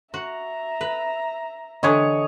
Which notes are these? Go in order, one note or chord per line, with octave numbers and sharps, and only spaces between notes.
F#4 E5 A#5
B4
D3 E3 D4 C#5 D#5